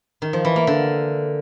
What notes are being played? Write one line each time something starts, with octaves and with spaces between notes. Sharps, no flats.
D#3
F3
E3
A#3
D3